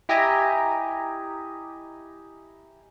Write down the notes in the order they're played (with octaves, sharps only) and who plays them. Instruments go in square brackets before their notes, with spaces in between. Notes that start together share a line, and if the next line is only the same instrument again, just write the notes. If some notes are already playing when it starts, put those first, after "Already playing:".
[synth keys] E4 G4 D#5 E5 G#5 A#5